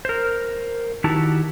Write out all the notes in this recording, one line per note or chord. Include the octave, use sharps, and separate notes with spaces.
A#4 C5
D#3 D#4 E4 F#4 G4 A5